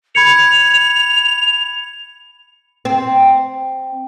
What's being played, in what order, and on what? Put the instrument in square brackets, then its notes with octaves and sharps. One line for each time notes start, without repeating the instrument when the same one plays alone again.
[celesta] B5 G#6 C#7 [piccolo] F7
[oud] C4